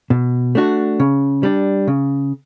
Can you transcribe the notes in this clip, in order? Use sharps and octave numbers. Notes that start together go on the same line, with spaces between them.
B2
A3 D4 F#4
C#3
G3 D4
C#3